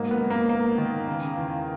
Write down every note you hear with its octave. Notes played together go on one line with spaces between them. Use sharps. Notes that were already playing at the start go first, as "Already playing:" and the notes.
Already playing: G#2 F#3 A#3
B3
G#2
A#3
G#2 A#3
D#3
C#3
E2